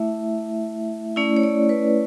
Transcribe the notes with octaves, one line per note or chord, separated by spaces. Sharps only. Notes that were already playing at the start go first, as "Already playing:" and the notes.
Already playing: A3 E4 E5
A3 C#4 E4 D5
C#5
D5
B4